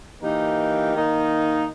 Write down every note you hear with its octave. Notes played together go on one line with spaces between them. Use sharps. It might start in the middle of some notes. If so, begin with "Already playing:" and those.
E3 A#3 D#4 G4 A#4
D#3 A#3 D#4